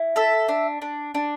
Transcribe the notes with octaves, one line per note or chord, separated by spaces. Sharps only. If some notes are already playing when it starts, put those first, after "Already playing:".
Already playing: E4
A4 E5
D4
D4
D4